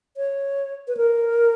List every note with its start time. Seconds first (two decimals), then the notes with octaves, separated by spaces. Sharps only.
0.17 C#5
0.88 B4
0.97 A#4